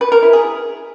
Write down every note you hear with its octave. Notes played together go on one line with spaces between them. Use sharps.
B4
A#4
E4
G#4